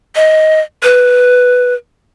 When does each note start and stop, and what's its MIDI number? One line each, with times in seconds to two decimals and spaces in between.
0.16 0.61 75
0.83 1.74 71